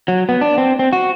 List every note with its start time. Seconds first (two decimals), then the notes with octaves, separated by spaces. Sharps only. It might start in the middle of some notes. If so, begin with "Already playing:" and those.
0.08 F#3
0.29 B3
0.41 D4
0.58 C4
0.79 C4
0.93 F#4